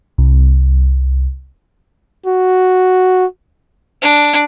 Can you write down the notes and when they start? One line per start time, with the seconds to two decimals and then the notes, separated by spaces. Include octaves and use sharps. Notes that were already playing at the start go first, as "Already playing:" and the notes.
0.18 C2
2.26 F#4
4.01 D4